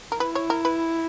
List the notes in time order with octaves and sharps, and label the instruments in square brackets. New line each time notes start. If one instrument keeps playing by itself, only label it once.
[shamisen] A#4
[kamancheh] E4 [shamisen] B4
[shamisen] C#5
A#4
B4